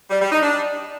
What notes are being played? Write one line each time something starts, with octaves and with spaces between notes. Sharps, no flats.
G3
G3
D#4
D4